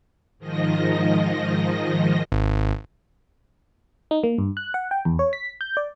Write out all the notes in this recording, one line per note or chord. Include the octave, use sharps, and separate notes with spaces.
G#2 D#3 F3 D#5 A#6
G#1
D#4
A#3
G2
F#6
F#5
G5
E2
C#5
B6
G6
D5